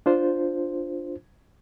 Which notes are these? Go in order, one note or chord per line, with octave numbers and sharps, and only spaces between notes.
D4 F4 C5